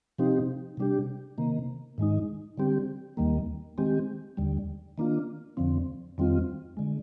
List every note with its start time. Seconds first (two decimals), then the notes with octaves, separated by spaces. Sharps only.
0.18 C3 F3 C4 D#4 G4
0.77 C3 G3 D4 G4
1.38 C3 D#3 A#3
1.98 G#2 D#3 G#3 D#4
2.58 D3 G3 C4 G4
3.17 D#2 D#3 G3 A#3
3.78 D#3 G#3 C4 G4
4.37 D#2 D3 G3
4.98 D#3 A#3 D4 F4
5.57 F2 D3 F3 C4
6.18 F2 D#3 G3 C4 F4
6.77 D3 G#3